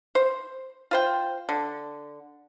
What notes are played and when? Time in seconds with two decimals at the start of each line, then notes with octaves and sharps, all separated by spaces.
0.15 C5
0.91 F4 C5 G5
1.49 D3